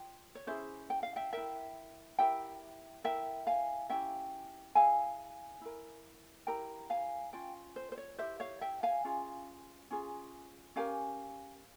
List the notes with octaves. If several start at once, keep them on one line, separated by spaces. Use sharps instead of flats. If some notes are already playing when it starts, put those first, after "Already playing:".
Already playing: F4 G5
C#5
C#4 E4 G#4 C5 E5
G5
F5
E5 G5
E4 A#4 E5 G5
E4 G4 A#4 E5 G5
E4 A#4 E5 G5
F5 G#5
C#4 E4 G4 E5 G5
E4 G#4 F5 G#5
E4 A#4
E4 G4 A#4 G5 A#5
F5 G#5
C#4 F4 G5
C5
C5
C#5
E4 G4 A#4 C5 E5
C#5 F5
E5 G5
F5 G#5
C#4 F4 G#4
C#4 F4 G#4
C#4 G4 A#4 F5 G#5